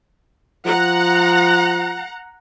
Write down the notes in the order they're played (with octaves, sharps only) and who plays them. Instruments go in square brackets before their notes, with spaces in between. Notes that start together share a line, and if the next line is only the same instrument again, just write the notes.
[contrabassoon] F3 [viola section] F#5 A#5